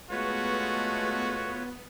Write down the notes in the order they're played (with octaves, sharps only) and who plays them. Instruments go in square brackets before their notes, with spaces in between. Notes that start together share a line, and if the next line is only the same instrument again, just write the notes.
[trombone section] G#3 A3 [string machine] B3 [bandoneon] F4 B4 C#5 [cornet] F#4